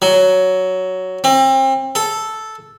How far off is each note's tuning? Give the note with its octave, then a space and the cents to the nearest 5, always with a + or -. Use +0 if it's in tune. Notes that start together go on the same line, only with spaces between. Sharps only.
F#3 +10
C4 +35
A4 -5